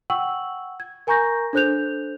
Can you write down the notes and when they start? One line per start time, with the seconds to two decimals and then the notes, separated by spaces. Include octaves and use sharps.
0.10 F#5 G5 C#6 E6 F#7
0.80 G#6
1.07 A#4 G#5 A#5 C#6 G6 A#6
1.53 D4 A4 C5 F#6 G6 F7